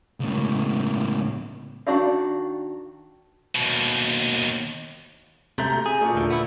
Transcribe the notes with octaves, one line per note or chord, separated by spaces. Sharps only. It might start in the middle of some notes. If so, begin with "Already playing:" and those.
C#2 A2
D#3 D4 F#4 D5 F5
D#2 B2
C3 A3 A#5 G6
A#5 G6
G#4
A#2 A3
D#2 D3
B3 E4